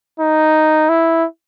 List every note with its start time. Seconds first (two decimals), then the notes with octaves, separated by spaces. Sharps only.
0.20 D#4
0.89 E4